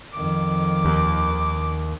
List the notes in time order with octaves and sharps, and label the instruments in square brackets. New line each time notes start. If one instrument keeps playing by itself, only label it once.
[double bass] F2 D#3 [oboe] D6
[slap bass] D#2